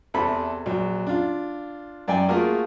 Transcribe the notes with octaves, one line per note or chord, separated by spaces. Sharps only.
E2 C3 A4 B5
A#1 F#3
D4 F4
F#2 D5 G5 G#5
A3 A#3 F4 F#4 G#4 A#4